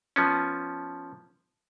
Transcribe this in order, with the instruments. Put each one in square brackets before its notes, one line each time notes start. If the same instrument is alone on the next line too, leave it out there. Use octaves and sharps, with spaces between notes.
[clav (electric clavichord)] F3 B3 C#4